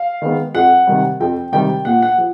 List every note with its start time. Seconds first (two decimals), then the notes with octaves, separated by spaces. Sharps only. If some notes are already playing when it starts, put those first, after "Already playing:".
Already playing: F5
0.22 D#3 G#3 B3
0.55 F2 F#5
0.87 C3 D#3 G3
1.20 F2 G5
1.52 C3 D#3 G3 G5
1.85 A#2 F#5
2.02 F#5
2.18 F3